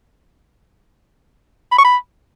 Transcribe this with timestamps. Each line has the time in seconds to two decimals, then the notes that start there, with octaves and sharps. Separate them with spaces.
1.72 B5
1.78 C#6
1.84 B5